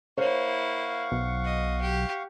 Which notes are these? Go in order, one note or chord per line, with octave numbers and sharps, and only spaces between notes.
A#3 E4 C5 C#5 F5 F#5 C#6
B1
D#5
G4